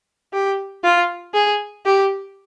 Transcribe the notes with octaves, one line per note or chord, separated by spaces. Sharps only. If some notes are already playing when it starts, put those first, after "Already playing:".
G4
F4
G#4
G4